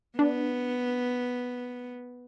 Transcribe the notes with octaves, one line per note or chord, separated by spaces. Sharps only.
B3 D4